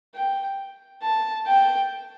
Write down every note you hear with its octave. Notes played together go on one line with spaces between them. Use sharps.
G5
A5
G5